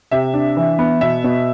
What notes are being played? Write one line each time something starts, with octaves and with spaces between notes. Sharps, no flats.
C3 E5
D4
E3
B3
B2 E5
B2